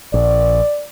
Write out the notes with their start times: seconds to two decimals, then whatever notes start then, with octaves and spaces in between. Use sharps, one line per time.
0.14 A#1 D5